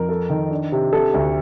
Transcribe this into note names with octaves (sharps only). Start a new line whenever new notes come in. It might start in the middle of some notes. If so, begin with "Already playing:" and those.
Already playing: F2 A#4
A4
D#3
D4
C3
C3 A4
D2